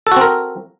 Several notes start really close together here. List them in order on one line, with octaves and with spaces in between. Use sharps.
A4 F#4 C4 A#4